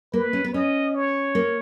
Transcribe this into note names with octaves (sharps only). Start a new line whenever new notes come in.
A#3 B4
C#4
B3
C#4 D#5
C#5
A#3